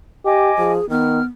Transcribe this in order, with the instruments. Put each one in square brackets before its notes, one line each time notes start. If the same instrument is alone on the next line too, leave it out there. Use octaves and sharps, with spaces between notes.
[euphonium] G4 [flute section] D#5 G#5 D6
[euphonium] F3 [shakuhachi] G#4
[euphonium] D#3 [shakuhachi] B3 [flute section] F6